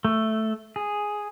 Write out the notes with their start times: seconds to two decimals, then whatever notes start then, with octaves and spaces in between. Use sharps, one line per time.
0.05 A3
0.76 G#4